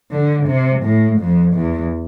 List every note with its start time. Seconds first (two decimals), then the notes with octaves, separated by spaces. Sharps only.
0.11 D3
0.47 C3
0.83 A2
1.19 F2
1.55 E2